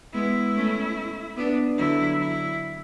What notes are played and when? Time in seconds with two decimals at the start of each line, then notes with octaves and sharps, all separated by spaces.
0.13 G#3 B3 E4
0.55 A3 C#4
1.37 B3 D4
1.78 D3 F#3 E4
2.20 E4